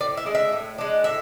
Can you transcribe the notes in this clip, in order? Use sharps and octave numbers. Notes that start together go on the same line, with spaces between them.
A2 D5
E5
G#3 D4
E5
A2
G#3 D4
A2 E5